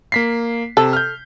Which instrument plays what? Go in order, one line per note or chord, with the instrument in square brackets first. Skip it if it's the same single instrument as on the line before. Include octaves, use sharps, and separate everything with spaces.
[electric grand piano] A#3 B6 C7
[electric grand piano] C3 E6 [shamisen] A4
[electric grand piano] F6 G6